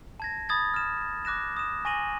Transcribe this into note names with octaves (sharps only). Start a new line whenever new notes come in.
A5 G#6 A#6
B5 D#6 G#6 A6
F6 E7
D6 F#6 A#6 E7
D#6 E7
G#5 C#6 A#6 D#7 F#7